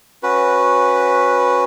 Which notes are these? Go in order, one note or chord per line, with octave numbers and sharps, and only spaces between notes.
C#4 F#4 B4